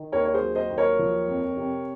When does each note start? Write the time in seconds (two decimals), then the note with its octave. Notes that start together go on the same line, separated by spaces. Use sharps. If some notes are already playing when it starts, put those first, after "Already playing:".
Already playing: D#3
0.12 D#2 A#4 C#5
0.25 C#5
0.34 G#4 C5
0.41 F#3
0.55 C5 D#5
0.70 D#2
0.78 A#4 C#5
0.99 F3
1.28 F2
1.57 C3